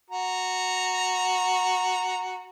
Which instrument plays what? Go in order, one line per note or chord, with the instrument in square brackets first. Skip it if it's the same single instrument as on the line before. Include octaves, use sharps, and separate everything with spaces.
[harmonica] F#4 A#5